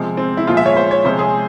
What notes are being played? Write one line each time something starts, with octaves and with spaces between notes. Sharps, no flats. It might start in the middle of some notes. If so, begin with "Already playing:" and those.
Already playing: C3 F3 G#3
C4
E4
A#2 F3 G#3 F4
E5
C#5
C5
C#5
C3 F3 G#3 C5
G#4